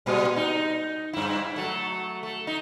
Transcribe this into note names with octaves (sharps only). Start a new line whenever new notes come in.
A#2 G3 G#3
D#4
G2 E4
F#3 A3
A3
D#4